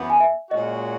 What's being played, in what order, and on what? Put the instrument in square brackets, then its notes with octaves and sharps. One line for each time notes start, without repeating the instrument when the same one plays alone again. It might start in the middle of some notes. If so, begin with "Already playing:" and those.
Already playing: [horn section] F#2 E3 B3
[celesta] G#5
E5
[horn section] A#2 G#3 C#4 F#4 [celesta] D#5